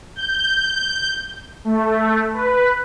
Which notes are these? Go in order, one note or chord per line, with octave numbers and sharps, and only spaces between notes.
G6
A3
B4